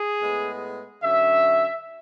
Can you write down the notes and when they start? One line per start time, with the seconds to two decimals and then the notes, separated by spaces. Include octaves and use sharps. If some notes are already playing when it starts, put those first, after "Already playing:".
Already playing: G#4
0.21 A2 G#3 B3
1.03 D3 F#3 C#4 E5